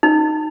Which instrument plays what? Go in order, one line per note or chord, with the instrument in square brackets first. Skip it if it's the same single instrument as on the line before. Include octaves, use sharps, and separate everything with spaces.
[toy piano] D#4